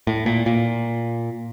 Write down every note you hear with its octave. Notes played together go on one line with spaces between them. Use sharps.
A2
A#2
A#2